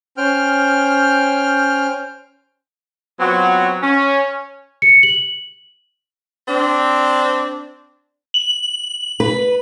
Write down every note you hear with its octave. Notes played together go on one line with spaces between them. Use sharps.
C#4 C5 G5 F6
F#3 B3 C4 F4 F#4
C#4
C#7
F#7
C4 D4
F#7
B4